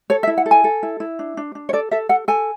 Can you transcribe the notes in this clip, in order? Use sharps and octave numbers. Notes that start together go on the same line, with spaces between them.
A4 C#5
E5
E4
F#5
A4
G#5
A4
E4
E4
D4
D4
D4
C#5
A4 D5
A4 E5
A4 F#5
A4 G#5